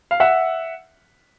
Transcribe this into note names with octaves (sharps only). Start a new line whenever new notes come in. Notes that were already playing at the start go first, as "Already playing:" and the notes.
F5
E5 F#5